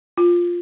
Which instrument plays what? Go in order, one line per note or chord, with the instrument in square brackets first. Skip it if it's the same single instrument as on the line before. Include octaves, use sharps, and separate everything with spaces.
[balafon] F4